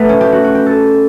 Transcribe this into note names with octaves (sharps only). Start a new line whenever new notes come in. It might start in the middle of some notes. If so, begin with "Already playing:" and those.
Already playing: A3 B3
C#4
G4
F#4
F#4
G4
A4